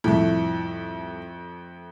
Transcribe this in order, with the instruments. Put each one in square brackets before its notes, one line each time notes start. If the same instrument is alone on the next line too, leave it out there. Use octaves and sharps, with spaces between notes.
[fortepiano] C2 A2 [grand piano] F2 A3